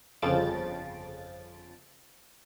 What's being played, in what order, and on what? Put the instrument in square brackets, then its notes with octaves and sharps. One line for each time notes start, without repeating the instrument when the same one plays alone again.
[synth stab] G1 F2 C#3 F3 A6 D7